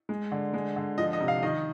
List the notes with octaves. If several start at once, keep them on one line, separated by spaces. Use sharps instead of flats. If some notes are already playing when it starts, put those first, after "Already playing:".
G#3
D3
G#3
D3
F3 D#5
D#5
C3
F5
D#3 D#5